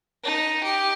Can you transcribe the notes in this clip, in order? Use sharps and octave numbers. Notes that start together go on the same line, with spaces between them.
D#4
G4